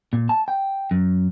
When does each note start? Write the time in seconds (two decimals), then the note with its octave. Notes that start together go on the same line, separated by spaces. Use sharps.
0.13 A#2
0.29 A5
0.48 G5
0.91 F#2